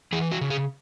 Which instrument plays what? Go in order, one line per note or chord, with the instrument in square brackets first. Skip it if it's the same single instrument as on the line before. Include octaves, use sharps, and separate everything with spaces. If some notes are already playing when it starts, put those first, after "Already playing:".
[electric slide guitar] E3 G#4
F#4
C#3
G#4